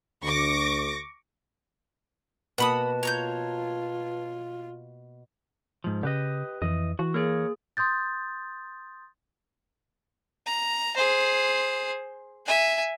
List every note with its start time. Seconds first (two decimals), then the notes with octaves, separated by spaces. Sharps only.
0.23 D2 C#6 D6 A#6
2.58 B2 A#3 F#4 B4 F#5 A5 B5 D#6
3.03 F4 C#5 A#5 G6
5.84 G#2 F3
6.03 C#3 G4 B4 D#5
6.62 F2 E3 D#5
6.99 E3 F#4
7.14 A#3 G#4 A#4 C#5
7.77 C6 D#6 G6 A6
10.46 A#5
10.97 G#4 C5
12.46 E5 G#5